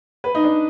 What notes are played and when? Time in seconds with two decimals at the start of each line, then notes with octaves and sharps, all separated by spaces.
0.24 B4
0.35 D#4
0.44 D4